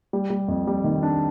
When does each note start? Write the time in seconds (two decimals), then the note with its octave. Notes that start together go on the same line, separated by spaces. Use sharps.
0.13 G3
0.30 G3
0.48 F2
0.67 G3
0.84 D#3
1.03 D4